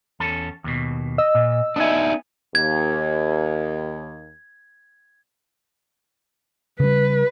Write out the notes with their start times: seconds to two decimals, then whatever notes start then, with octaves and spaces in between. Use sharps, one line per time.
0.20 E2 C#4 A4
0.64 D#2 B2
1.18 D#5 E6
1.35 A#2
1.76 B3 D4 D#4 E5 G#5
2.55 D#2 G#6
6.80 C#3 G3 B4